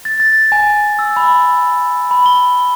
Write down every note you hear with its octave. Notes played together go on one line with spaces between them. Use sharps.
A6
A6
G#5
E6
B5
B5
G7